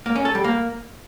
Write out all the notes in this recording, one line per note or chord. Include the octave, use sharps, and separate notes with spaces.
A#3
C#4
A4
G3
A#3